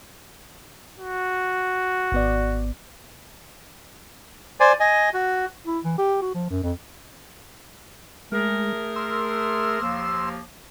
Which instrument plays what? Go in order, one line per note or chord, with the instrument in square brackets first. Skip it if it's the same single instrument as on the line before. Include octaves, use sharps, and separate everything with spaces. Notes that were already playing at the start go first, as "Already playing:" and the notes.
[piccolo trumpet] F#4
[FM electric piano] G#1 B3 D5
[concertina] C5 D5 G#5
D#5 G#5
F#4
[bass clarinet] E4
E3
G4
F#4
F3
F#2
F2
[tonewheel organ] G#3 [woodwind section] A3 G#4 A#4
[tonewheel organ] C6 E6
[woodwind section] D#2 F3 A#3